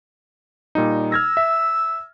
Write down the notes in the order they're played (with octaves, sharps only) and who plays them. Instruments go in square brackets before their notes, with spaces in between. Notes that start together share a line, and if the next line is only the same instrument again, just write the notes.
[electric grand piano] A#2 G3 D#4
[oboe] E6 [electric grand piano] F6 G#6 A#6
[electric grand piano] E5